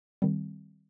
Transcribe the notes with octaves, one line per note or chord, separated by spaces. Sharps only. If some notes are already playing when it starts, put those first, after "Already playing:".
D#3 G3 C4